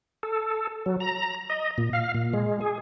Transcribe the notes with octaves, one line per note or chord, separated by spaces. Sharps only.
A4
F#3
A#5
D#5
A#2
F5
A#2
G#3
G#4